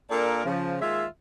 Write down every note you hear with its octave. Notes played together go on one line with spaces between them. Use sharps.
A#2 A#3 D4 A4 A#4 D5
C#3 F3
D#2 G#3 F4 E5